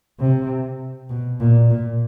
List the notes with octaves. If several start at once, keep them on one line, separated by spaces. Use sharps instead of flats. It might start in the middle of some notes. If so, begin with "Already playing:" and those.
C3
B2
A#2
A#2